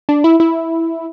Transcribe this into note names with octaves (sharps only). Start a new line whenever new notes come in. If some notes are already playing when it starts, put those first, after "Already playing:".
D4
E4
E4